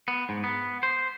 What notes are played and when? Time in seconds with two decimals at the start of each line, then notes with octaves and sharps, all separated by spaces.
0.08 B3
0.29 G#2
0.44 B3
0.83 C5